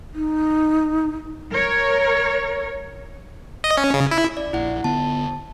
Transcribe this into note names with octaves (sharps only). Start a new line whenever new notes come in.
D#4
A#4 C#5
D#5
C#4
C#3
E4
D5
A#1 E4 F#5
D3 B3 A5